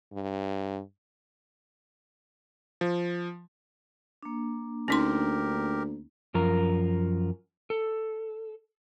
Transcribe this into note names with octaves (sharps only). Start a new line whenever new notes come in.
G2
F3
A#3 D4
D2 C#4 D#4 G4 A#4 C6
F#2 F3 A#4 A#5
A4